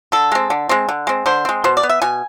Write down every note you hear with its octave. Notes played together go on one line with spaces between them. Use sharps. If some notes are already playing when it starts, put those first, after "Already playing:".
D3 A4
G#3 C4
D3
G#3 C4
D3
G#3 C4
D3 C5
G#3 C4
B2 C5
D5
B3
E5
B2 G#5